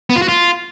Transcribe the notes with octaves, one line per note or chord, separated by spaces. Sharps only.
B3
F4
F#4
F4